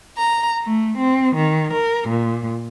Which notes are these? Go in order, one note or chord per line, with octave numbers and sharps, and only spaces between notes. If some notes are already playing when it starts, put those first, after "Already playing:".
A#5
A3
C4
D#3
A#4
A#2